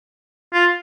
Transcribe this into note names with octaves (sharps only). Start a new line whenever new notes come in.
F4